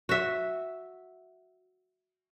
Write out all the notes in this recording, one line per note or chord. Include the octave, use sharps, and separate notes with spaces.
F#4 E5